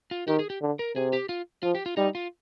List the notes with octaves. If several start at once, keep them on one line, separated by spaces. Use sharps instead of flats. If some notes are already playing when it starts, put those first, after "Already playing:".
F4
D#3 G4
G#4
G4
D3
A#4
C3 G#4
G4
F4
F3 F4
G4
F4
G3 D#4
F4